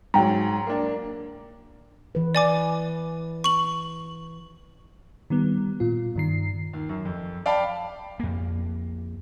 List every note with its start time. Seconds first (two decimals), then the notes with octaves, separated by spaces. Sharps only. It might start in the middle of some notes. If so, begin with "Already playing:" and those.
0.14 G#2 F#3 G5 A#5
0.67 A#3 D4
2.15 E3 B4
2.35 D5 G#5 D6
3.44 C#6 F#7
5.30 D#3 G3 B3
5.80 A#2 F4
6.16 G2 D#3 C7
6.73 D#2
6.89 F#2
7.05 F2
7.46 D5 F5 G5 A5 B5
8.20 F2 A#3